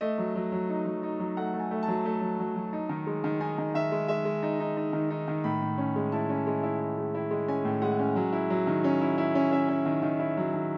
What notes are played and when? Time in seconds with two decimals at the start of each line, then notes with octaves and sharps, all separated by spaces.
0.01 A3 D#5
0.18 F#3
0.35 F#3
0.52 F#3
0.69 D#4
0.85 F#3
1.03 D#4
1.19 F#3
1.37 A3 F#5
1.54 A3
1.60 G#5
1.71 A3
1.83 A5
1.88 F#3
2.05 A3
2.21 F#3
2.39 F#3
2.56 F#3
2.73 D#4
2.89 D#3
3.07 G#3
3.24 D#3
3.40 D#4 G#5
3.58 D#3
3.74 D#3 E5
3.92 G#3
4.08 G#3 E5
4.25 G#3
4.43 D#4
4.60 D#4
4.77 D#4
4.93 D#3
5.10 D#4
5.28 D#3
5.44 A2 B5
5.62 A2
5.78 C#4
5.96 G#3
6.12 E4 A5
6.29 C#4
6.47 G#3
6.63 E4
6.80 E4
6.98 G#3
7.15 E4
7.31 G#3
7.48 C#4 G#5
7.65 A2
7.82 G#3 F#5
7.99 C#4
8.16 F#3
8.33 E4
8.50 F#3
8.67 D#3
8.84 C#4
9.01 E4
9.18 E4
9.35 C#4
9.51 C#4 E5
9.68 C#4
9.86 D#3
10.03 D#3
10.19 E4
10.37 F#3
10.54 D#3